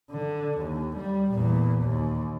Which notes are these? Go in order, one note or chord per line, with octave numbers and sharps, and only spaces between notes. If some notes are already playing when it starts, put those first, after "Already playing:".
D3
D#2
G3
E2 A#2
D#2